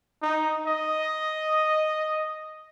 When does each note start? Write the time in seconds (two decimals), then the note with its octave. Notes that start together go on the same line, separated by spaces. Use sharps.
0.23 D#4
0.67 D#5